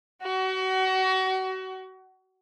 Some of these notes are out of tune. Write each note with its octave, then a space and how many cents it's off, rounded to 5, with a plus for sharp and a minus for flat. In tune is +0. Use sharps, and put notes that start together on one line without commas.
F#4 +30